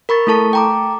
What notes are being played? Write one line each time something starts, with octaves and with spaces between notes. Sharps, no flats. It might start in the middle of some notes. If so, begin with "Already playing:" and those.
A#4 B5 C#6 A6
A3 E4 A4 A5 C#6
G5 A#5 D6